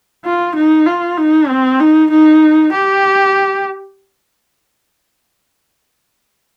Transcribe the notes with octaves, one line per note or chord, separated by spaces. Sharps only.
F4
D#4
F4
D#4
C4
D#4
D#4
G4